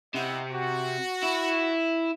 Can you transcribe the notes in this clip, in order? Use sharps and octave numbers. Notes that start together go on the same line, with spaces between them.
C3 E4 D#5 F#5
F#4
E4